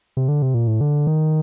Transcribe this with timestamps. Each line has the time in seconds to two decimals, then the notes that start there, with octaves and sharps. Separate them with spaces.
0.17 C3
0.28 D3
0.42 C3
0.54 A#2
0.67 A2
0.81 D3
1.07 D#3